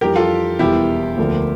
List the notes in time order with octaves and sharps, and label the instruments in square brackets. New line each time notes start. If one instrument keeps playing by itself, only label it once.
[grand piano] F2 E3 G3 D4 [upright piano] G4 A#4
[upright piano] F4 A4
[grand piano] E1 E2 E3 G3 [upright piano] E4 G4
[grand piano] D2 D3 F3 A#3 D4